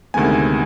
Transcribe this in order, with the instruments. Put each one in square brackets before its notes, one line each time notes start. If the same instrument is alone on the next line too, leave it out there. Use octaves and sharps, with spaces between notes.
[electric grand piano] D2 C3 D#3 G#3 B3 G#5